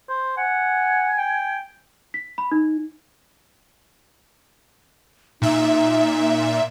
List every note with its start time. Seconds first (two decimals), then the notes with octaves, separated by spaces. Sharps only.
0.09 C5
0.37 F#5 G#5
1.18 G5
2.14 B6
2.38 B5
2.52 D#4
5.42 A#2 D#4 E5